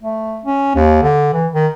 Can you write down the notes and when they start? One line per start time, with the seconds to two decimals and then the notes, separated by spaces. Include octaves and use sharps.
0.02 A3
0.45 C#4
0.75 D#2
1.02 D3
1.33 E3
1.53 D#3